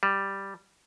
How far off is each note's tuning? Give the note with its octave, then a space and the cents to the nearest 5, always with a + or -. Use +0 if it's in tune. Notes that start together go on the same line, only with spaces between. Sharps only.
G3 +0